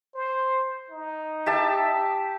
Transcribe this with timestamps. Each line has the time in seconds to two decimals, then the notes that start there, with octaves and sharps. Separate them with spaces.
0.15 C5
0.90 D#4
1.46 G4 E5 A5